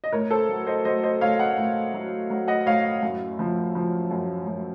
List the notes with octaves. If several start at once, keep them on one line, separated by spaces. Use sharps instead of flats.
D#5
A2 A#4 C#5
A4 C5
F#3
C5 D#5
F#3 C5 D#5
C5 D#5
A2 C#5 F5
D#5 F#5
A2
F#3
F#3
D#5 F#5
A2 C#5 F5
F#2
F3
F3
F#2
F#2